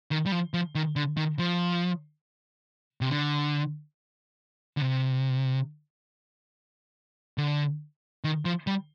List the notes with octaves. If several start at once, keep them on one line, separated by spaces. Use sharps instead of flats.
D#3
G3
F3
F3
D#3
D3
D#3
F3
C3
D3
D3
C3
D3
D#3
F3
G3